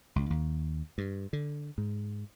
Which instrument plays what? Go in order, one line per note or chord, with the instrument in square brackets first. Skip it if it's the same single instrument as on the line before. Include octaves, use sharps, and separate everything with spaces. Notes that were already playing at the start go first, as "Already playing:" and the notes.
[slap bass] C#2
D#2
G2
D3
G#2